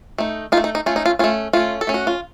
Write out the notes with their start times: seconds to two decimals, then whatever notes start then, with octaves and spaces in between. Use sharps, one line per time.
0.18 A3 D#4
0.52 D#4 F4
0.57 A3
0.64 D#4
0.75 D#4
0.86 A3 C#4 F4
0.96 D#4
1.06 F4
1.19 A3 C#4 F4
1.53 A3 C#4 F4
1.81 A4
1.87 A3 C#4
1.94 F#4
2.07 F4